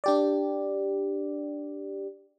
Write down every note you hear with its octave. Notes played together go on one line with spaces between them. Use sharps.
D4 G4 D5